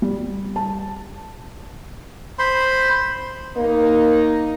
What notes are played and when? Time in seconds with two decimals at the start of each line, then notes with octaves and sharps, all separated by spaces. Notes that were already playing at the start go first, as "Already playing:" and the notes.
0.02 G3
0.56 A5
2.39 C5 B5 C6
3.57 A#3 D#4